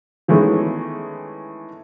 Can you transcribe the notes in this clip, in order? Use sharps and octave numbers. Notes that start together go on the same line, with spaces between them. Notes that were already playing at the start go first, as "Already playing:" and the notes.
D#3 E3 G#3 A3 B3 C#4